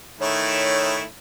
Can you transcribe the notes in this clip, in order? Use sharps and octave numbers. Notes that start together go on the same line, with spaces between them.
D#3 A3 E4 C#5